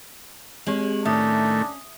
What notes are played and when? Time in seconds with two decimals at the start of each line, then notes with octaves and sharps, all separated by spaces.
0.67 G#3 C4 G4 F#7
1.05 A2 D#3 A3 C#4 D4 E5 D#6